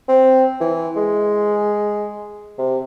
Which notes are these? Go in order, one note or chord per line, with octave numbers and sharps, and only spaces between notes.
C4
E3
G#3
C3